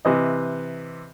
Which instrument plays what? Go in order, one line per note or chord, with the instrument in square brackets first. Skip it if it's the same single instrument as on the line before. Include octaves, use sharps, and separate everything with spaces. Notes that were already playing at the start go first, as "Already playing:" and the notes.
[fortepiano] C3 E3 D#5